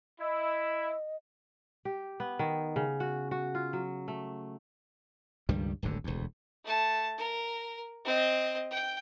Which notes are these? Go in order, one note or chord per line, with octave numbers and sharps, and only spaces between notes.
E4 D#5
G4
B3
D#3
C#3
F#4
F#4
F4
F#3
A3
C#2 G2 D#3 G3
D1 G#1 G2 D3
E1 D2
A3 A5
A#4
C4 D#5
G5